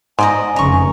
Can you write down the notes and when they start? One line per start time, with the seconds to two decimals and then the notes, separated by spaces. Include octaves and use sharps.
0.19 G#2 D5 D#5 G#5 A#5
0.56 F1 C#3 A#5 C#6